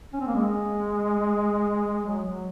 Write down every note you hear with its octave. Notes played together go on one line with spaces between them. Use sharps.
C#4
C4
A#3
G#3
F#3
F#3